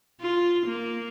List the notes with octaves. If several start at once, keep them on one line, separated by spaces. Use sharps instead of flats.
F4
A#3